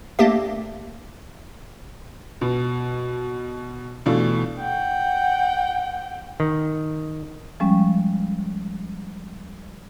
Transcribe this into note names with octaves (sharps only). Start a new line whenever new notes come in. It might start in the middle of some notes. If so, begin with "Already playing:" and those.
A3 A#3 D4 G4 E5
B2
B2 E3 A3 D4 F4
F#5 G5
D#3
F3 G3 G#3 C#4